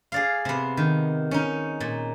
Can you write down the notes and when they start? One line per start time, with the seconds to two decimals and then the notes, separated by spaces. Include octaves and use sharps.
0.12 G#4 D5 F5
0.45 C3 B3
0.77 D#3
1.31 C#4 D#4
1.80 A#2